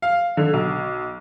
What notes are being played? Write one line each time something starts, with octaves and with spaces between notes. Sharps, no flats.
F5
D3
B1